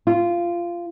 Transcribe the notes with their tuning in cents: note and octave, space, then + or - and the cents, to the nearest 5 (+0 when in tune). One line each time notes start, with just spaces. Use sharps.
F4 -15